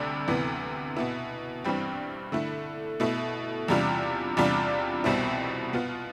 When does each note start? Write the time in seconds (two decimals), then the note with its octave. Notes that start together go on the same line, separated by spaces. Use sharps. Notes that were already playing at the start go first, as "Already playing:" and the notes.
Already playing: D2 C3 G3 D4
0.28 D2 C3 E3 B3
0.97 B2 B3 E4
1.64 G2 E3 G3 C4
2.32 D3 A3 E4
3.00 B2 A3 E4
3.68 E2 C3 G3 D4 F4
4.37 E2 C3 G3 D4 F4
5.04 C2 B2 G3 C4 E4
5.73 B2 B3 F4